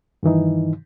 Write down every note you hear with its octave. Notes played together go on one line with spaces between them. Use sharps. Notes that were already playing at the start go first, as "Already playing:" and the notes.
G2 D#3 E3 D#4